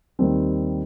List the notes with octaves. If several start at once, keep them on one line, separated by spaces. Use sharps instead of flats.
D#2 D#3 G3 C4